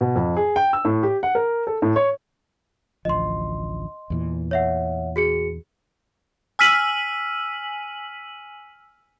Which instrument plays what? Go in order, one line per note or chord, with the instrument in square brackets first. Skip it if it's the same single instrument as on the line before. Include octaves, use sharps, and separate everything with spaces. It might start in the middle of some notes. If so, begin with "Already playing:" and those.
[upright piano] B2
F2
G#4
G5
E6
A2
G4
F#5
A#4
A4
A2
C#5
[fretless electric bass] A1 D2 F3 [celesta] D#5 C6
[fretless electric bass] E2 A#2 E3
[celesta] C#5 E5 F#5
F#4 G#4 C#7
[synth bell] G#5 E6 F6 B6 D#7 F#7